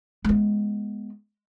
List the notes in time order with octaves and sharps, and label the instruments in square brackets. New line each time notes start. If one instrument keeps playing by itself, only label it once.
[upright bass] G#3 B3